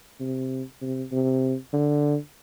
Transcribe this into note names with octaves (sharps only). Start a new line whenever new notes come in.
C3
C3
C3
D3